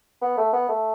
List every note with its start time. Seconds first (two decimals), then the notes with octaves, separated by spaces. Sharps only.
0.22 B3
0.38 A3
0.53 B3
0.69 A3